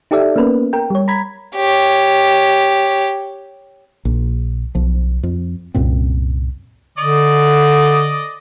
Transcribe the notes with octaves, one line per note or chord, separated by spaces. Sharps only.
D#4 G4 A4 D5 E5
A#3 B3 C#4 A#4 B4
A#4 G5
G3 C#5
A#5 B5 G#6 B6
G4 C#5
A#1
B1 F3
F2
C2 F#2 A#2 C4
D3 D5 D#5